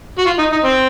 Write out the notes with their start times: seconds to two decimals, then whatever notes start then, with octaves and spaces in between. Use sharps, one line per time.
0.18 F#4
0.26 F4
0.38 D#4
0.52 D#4
0.64 C4